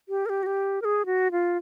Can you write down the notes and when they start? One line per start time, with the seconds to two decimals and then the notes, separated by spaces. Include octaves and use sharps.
0.09 G4
0.26 A#4
0.29 G4
0.43 F#4
0.46 G4
0.82 A#4
0.85 G#4
1.06 F#4
1.32 F4